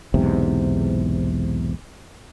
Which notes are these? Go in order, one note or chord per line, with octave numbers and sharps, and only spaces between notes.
B1 E2 G#2 C3